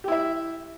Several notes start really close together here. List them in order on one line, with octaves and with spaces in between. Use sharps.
G4 E4 E5